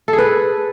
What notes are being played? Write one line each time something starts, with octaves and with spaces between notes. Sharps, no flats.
A4
G#4
B4